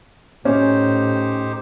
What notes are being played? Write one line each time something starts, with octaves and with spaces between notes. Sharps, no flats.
A2 C#4 D#4 G4 C5